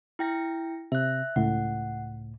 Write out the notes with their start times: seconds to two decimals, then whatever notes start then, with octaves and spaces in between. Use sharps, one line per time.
0.19 E4 G5 A#6
0.92 C3 E5 F#6
1.36 C#2 A2 F#5